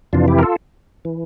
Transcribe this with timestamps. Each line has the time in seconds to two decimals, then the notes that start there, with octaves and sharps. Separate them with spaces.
0.13 F2 C3 E3 D4 F4
0.28 E4 G4
0.39 A#4
0.43 F4 A4
1.05 E3